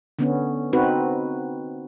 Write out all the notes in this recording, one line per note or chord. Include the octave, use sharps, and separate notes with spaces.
D3 B3 C#4
C4 D#4 F#4 B4